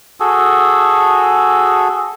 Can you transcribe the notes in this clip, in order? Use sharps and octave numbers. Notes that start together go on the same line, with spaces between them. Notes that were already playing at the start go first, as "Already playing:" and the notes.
F#4 G#4 A4